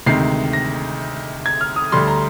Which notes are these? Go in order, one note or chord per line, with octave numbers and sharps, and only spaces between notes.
D2 C3 D#3 G#3 C7
A#6
G#6
F6
D#6
D2 D3 G3 C6
A#5